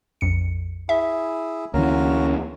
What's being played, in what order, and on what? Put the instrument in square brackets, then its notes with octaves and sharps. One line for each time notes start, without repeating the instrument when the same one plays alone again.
[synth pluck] A#1 F2 C#7
[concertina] E4 G#4 [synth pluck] E5
[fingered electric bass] D2 E3 [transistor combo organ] A#3 C#4 [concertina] F#4 F5 A#5